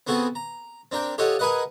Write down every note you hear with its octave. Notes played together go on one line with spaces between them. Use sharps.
B3 C4 F#4 G#4 A4
A#5
C4 D4 A#4 G5
F4 G4 A4 C#5 D#5 F#5
G#4 A#4 B4 D#5 F#5